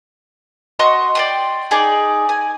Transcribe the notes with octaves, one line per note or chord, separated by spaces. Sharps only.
F#4 D#5 C6 C#6
D5 G5 C6
D#4 G#4 D5
G#5